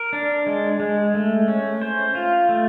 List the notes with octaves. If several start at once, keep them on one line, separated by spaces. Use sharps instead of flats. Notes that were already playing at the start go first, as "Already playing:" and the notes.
Already playing: A#4
D4
G#3
G#3
A3
C#4
C5
F4
A3